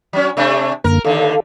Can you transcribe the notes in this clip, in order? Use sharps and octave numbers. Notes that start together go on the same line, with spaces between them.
F#3 C#4
C3 A3 D4
F#2 D3 A#3 A#4
D#2 D3 A4 F5